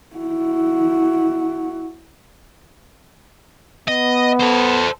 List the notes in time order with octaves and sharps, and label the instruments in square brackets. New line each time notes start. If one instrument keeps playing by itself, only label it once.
[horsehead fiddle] E4 F#4
[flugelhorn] B3 [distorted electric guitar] D#5
[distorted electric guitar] A4 C5